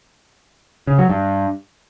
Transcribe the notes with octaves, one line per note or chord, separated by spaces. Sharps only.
C#3
F#3
G2